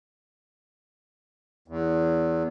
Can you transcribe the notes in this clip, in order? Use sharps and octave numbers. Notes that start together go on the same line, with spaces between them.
E2